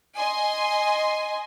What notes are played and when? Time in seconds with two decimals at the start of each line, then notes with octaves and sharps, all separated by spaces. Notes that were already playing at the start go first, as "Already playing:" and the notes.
0.16 D#5 G#5 C6